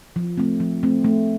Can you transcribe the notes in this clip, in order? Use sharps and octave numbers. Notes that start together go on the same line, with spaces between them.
F3
A3 C4
F3
A3 C4
A3